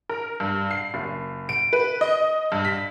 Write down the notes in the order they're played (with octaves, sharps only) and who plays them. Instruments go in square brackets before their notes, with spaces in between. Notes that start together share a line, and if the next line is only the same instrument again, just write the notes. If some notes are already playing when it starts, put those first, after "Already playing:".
[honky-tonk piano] A#4
G2
C7
F#1
D7
B4
D#5
G2
B6